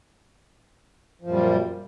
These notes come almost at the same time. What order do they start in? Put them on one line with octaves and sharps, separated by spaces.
F3 F#2 A#2 G3